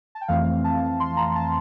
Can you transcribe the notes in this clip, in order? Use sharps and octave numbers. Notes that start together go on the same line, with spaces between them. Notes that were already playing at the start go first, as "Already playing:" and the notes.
A5
G5
F2 E3 A3 C4 F5
A5
C6
A#5
A5